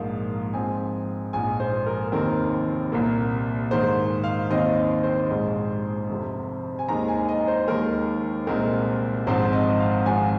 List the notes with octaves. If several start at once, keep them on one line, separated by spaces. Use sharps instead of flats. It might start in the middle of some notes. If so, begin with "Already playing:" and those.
Already playing: A#1 G#2 F3 A#3 F5
G#2 F3 C4 G#5
A#1 G#2 F3 G#5
C5
A#4
F1 D#2 D#3 C4 A#4
C2 A#2 A#3
G#2 D#3 A#3 C5
F5
D#2 D#3 C4 D#5
D#5
C5
A#1 G#2 G#3
F1 F2 C3
G#5
D#2 D#3 G#3 A#5
G#5
D#5
C5
D#2 D#3 G#3 A#4
C2 A#2 G#3 C4 A#4
G#1 G#2 F3 C4 C5
D#5
F5
G#1 G#2 F3 G#5